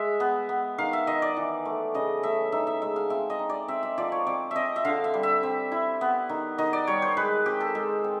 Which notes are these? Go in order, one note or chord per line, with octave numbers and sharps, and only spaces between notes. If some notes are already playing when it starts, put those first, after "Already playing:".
Already playing: G#3 E5
B3
B3
D#3 F5
E5
D#3 D#5
D5
E3
A3
C#3 D#5
A3 E5
D#4 E5
E5
G#3 E5
F5
C4 E5
D#5
D#4
D5
C4 E5
E5
F3 D5
C#5
C4 D5
C4 D#5 E5
E5
D3 F5
E5
G3
E5
C4
E4
B3
D#3
D#3 D#5
D5
G3 C#5
C5
G#3 B4
C4 G4
A4
G#3 A4
C4